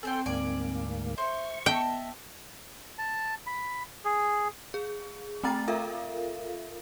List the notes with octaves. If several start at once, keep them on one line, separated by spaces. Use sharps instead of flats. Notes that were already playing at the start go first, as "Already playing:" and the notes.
C4 G#4 A4 C5 G5
D2 G#2 A#3 D5 G#5
C5 E5 C#6
B3 D#5 E5 G5 A5
A5
B5
G#4
G#4
A3 C4 G5 A#5 A6
F4 A4 A#4 E5 F5